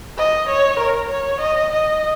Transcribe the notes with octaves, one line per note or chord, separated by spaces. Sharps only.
D#5
C#5
A#4
C#5
D#5
D#5